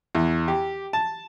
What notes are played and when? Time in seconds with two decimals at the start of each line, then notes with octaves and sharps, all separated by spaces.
0.15 E2
0.48 G4
0.93 A5